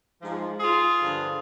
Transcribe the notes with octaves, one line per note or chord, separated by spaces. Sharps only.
G#2 F3
F4 G#4
G2 D3 F3